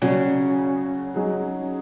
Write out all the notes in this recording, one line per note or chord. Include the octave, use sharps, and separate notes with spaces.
C#3 F#3 C#4 F#4
F#3 D#4 G#4